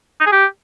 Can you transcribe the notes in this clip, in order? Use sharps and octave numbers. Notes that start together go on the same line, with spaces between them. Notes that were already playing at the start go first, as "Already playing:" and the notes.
D#4
G#4
G4